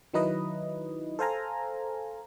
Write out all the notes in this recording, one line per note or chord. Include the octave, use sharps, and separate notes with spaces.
D#3 F#3 D#4 E4 B4 D#5
A4 C5 F5 G#5 A#5